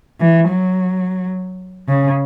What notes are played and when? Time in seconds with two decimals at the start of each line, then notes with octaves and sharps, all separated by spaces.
0.20 E3
0.49 F#3
1.88 C#3